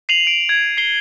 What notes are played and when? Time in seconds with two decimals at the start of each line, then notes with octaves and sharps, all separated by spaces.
0.09 C7 D#7 F7 F#7
0.27 D7
0.49 G#6
0.78 C7 G7